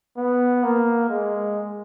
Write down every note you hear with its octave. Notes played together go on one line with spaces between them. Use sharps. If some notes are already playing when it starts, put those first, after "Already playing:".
B3
A#3
G#3